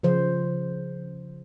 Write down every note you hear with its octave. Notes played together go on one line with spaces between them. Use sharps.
C#3 F3 C5